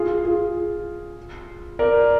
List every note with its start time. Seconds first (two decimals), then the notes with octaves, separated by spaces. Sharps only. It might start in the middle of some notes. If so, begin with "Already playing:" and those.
Already playing: F4 G#4
0.25 F4 G#4
1.79 A#4 D5